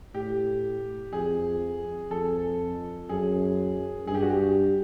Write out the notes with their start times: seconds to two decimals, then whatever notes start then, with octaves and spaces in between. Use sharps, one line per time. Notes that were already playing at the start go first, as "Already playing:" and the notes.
0.14 A2 G4
1.13 F2 G#4
2.11 F2 A4
3.09 F#2 G#4
4.07 G2 G#4
4.15 G4
4.22 F#4
4.30 G4